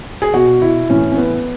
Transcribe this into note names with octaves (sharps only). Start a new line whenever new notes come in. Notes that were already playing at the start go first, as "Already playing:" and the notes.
G#4
B2 F#4
E4
A2 E3 C#4
C#4
B3